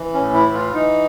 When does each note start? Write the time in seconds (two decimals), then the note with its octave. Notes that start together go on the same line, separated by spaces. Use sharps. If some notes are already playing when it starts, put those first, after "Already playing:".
Already playing: E3
0.14 C#4
0.21 A2
0.34 E4
0.47 E3
0.54 F4
0.74 E3 D#4